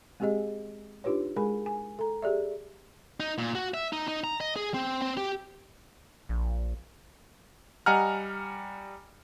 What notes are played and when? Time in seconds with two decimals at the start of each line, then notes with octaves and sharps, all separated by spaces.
0.20 G#3 C4 G4 G#4 D#5
1.04 D4 D#4 F4 G4 B4 C#5
1.36 G#3 G#4 A#4 G#5 B5
1.66 G#5
1.99 A4 A#5
2.22 G4 G#4 D5 E5
3.20 D#4
3.38 A#2
3.55 F#4
3.74 E5
3.93 D#4
4.08 D#4
4.24 A#5
4.41 D#5
4.56 G#4
4.74 C4
5.02 C4
5.17 G4
6.29 A#1
7.86 G3 D#5 F#5 G#5 A#5 F6